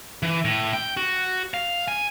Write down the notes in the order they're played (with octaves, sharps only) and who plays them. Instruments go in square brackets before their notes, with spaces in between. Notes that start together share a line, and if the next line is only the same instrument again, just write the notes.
[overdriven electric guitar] E3
A2
G5
F#4
F5
G#5